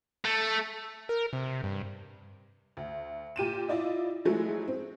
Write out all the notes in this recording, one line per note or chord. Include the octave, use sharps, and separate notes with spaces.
A3
A#4
C3
G2
D2
A#2 G4 D#7 E7
E4 F4 D5 D#5
F3 F#3 G#3 A3 E4
C4